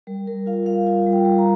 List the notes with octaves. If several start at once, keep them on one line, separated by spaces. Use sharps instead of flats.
G3 A#4
G3 A#4
F4 F5
G3 F5
F4 F5
G3
G5
G3
A#5